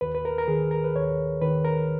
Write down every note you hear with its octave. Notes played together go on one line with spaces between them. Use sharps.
D#2 B4
B4
A#4
A#4
D#3 G#4
A#4
B4
D#2 C#5
D#3 B4
A#4